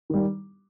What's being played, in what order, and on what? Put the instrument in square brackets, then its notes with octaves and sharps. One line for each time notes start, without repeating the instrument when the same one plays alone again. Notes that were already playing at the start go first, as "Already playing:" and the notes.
[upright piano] D#3 G3